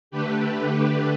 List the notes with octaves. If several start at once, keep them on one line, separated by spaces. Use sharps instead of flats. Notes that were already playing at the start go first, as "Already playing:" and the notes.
D3 A3 D4 G4 B4